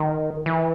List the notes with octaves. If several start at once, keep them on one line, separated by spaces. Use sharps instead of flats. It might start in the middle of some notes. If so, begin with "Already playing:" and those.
Already playing: D#3
E3